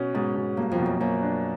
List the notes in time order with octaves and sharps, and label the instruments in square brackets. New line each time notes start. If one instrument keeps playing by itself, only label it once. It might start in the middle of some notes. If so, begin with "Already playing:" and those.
Already playing: [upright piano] B2 C#4
[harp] G#2 [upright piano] B2
[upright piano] B2
[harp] G2 [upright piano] A#3
[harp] F2
[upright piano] B2
[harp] F#2
[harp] F#2 [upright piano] A#3
[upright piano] D4